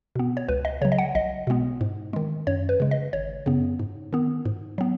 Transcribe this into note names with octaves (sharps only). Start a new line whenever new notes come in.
B2 B3
C#5
C#2 B4
D#5
C#3 F#3 C#5
D#5
F#5
B1 D#5
B2 G#3 B3
G#2
D#3 G#3
F#2 C#5
B4
C#3 G#3
D#5
G#1 C#5
F#2 C#3 B3
G#2
D#3 B3
G#2
F#3 B3